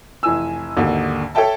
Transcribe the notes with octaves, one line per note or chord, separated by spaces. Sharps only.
F1 E3 G#5 E6
G#1 D#2 D3
A4 C#5 E5 G5 A5